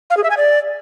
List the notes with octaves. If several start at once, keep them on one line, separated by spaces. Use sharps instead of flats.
F5
G#4
E5
G#5
D5